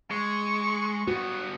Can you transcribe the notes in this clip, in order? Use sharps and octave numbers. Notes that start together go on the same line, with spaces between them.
G#3 C#6
G2 B3 F#4